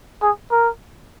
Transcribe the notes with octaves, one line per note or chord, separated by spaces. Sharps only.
G#4
A#4